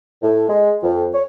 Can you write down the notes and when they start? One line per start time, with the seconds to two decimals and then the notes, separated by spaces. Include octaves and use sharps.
0.22 A2
0.48 G#3
0.82 F2
1.13 C#5